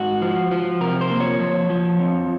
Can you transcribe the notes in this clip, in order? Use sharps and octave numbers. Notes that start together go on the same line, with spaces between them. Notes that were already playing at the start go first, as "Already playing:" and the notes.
Already playing: G#2 F#4
F3
F3
C3 A#4
C5
A#3
C#5
F3 C#5
F3
F2